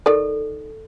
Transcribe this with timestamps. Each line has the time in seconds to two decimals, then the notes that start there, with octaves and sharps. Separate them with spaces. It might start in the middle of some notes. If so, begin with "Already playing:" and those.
0.06 D#3 A4 D5